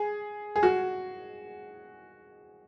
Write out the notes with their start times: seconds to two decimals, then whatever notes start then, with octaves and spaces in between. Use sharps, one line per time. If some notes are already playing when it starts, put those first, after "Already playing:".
Already playing: G#4
0.56 G#4
0.63 F#4